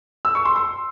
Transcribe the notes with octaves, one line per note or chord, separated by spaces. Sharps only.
E6
C#6
C6
C6